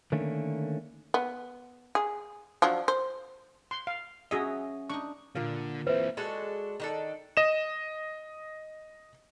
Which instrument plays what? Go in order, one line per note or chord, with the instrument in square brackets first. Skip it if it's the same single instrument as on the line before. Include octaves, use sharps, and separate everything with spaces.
[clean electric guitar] D3 D#3 A3 A#3 C#4
[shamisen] B3
G#4
F3 F#3 D4
C5
[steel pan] C6
F5
[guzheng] F#3 C#4 E5 [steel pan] F#4 G#4 D#5
[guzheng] D4 D#4 [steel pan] C#6
[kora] A#2 F5 [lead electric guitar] D3
[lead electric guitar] E3 C4 [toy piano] B4 [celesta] C5 E5
[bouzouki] G#3 D4 F#4 A4
D#3 D4 A4
[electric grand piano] D#5 E7